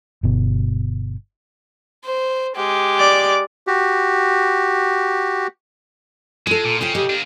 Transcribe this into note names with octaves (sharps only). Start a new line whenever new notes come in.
G1 B2
C5
G#3 G4
D5 D6
F#4 G4
G#3 F4 A4
A#2
C#3 F4 C5 G5
G4 D#5
A#3 D4